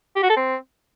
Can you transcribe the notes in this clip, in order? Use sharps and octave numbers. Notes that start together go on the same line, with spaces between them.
G4
F#4
A4
C4